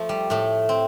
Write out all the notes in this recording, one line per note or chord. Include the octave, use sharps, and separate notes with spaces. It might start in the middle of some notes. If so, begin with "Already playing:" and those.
Already playing: F3 A3
G3
A2 A3
C4